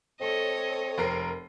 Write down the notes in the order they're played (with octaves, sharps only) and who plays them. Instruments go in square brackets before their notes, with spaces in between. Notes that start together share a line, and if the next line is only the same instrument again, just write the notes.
[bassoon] C4 [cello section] A4 C#5 [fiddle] D#5
[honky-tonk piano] F1 A#4 C7